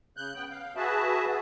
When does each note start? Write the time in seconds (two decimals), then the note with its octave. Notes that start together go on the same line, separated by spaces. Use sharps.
0.17 C#3 F#6 G6
0.35 B3 G5
0.51 F5
0.76 F#4 G#4 B4 E5 A5
1.28 F#4 G#4